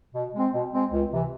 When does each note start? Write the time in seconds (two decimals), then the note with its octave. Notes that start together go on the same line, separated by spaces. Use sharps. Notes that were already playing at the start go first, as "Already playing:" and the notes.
0.14 B2
0.34 G#3 C4
0.53 B2
0.73 G#3 C4
0.92 C#2
1.12 C3 E3